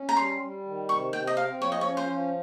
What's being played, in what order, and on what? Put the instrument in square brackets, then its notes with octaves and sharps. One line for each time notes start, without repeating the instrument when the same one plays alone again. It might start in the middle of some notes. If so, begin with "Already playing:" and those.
Already playing: [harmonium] C#4
[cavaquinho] A#5
[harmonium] G3 [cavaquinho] C6
[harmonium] G3
D#3
[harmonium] C3 [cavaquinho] C#6
[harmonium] C3 [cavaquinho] G5
[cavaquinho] D#5
[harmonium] C4 [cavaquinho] F5
[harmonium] F3 [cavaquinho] C#5
[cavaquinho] D#5
C#5
[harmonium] C#4
[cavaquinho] C5
[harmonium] F3